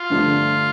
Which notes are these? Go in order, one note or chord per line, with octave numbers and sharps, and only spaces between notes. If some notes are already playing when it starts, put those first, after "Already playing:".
Already playing: F4
G2 D3 F3 A3 D4